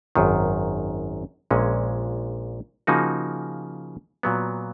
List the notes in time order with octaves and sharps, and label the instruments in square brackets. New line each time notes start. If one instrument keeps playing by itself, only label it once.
[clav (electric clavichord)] G#1 F#2 D#3
A#1 A#2 G#3 C#4
C#3 F3 A#3 D#4 F#4
A#2 F#3 B3